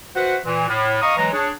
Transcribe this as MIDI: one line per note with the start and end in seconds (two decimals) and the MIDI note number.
0.15 0.36 66
0.15 0.36 71
0.15 0.36 72
0.15 0.36 76
0.15 0.36 78
0.45 0.67 46
0.45 0.67 52
0.68 0.98 45
1.02 1.16 75
1.02 1.16 77
1.02 1.16 82
1.02 1.16 85
1.02 1.16 87
1.17 1.28 52
1.17 1.28 54
1.17 1.28 56
1.17 1.28 82
1.32 1.49 62
1.32 1.49 68
1.32 1.49 73